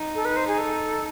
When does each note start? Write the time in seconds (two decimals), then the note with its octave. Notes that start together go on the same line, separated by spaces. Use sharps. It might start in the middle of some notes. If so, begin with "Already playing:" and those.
Already playing: D#4
0.15 A4
0.25 B4
0.37 C5
0.47 G#4
0.58 A4